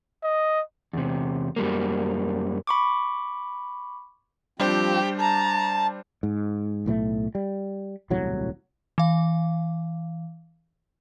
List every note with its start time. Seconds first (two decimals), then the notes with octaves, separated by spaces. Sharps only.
0.23 D#5
0.93 E2 C3
1.56 F#2 G3 A#3
2.67 B5 C#6 D6
4.60 F3 G3 C4 D4 G4 C5
5.20 A5 A#5
6.23 G#2
6.86 B1 A2 F#3 A3
7.35 G3
8.10 D#1 C2 A2 F#3
8.98 E3 F5